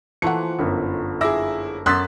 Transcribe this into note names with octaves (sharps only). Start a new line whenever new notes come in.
E3 F3 A3 A#3 F#5 C#7
G1 F#2 E4
E4 G#4 D6 E6 A#6
F#2 C6 D#6 E6 F#6 A6 B6